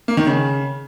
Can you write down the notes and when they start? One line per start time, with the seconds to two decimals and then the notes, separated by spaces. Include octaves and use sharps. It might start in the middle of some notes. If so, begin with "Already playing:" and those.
0.08 A#3
0.17 D#3
0.26 C#3